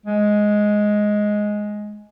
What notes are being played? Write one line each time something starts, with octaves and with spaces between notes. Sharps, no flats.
G#3